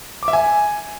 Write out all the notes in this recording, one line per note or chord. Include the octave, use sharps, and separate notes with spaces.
D6
E5
G#5